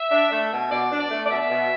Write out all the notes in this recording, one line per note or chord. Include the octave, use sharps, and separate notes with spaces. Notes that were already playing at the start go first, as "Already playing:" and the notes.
Already playing: E5
D4
A3
B2
B2 D5
D4
D5
A3
D5
B2 E5
B2